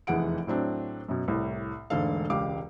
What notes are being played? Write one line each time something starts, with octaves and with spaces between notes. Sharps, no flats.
F1 E2 E3 G#4 F#5 D7
A2 F#3 C4 D4
F#2 B2
C2 A2
E1 G#2 D3 A3 A4 F5
E1 C#2 G4 F5 D6